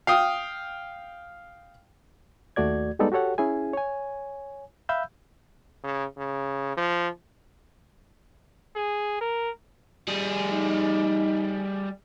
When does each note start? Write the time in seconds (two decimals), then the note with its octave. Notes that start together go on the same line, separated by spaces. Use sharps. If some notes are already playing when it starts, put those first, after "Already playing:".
0.07 F5 G5 D#6
2.56 D#2 A3 F#4 D5 G#6
2.99 G3 G#3 B3 D#4 A4 D5
3.12 F#4 G4 A4 C#5 F#5
3.38 C#4 E4 G#4 G#5
3.73 C#5 G#5
4.89 E5 F5 B5 E6 G6
5.84 C#3
6.17 C#3
6.77 F3
8.76 G#4
9.21 A#4
10.08 G3 G#4
10.52 D#4